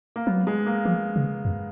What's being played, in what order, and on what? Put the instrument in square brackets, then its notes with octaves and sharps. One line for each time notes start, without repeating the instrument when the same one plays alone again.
[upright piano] A#3
[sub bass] F#3 [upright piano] B3
[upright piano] G#3
A#3
[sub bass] F3 [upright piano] A#3
[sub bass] C#3
F#2